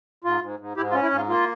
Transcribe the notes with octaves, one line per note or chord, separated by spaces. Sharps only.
G#2 F4
G#2
G#2
G#2 E4 G4
F4
C#4
E4
G#2
F4
A#3 F4